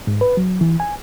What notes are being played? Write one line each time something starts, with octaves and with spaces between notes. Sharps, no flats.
G#2
B4
F#3
E3
G#5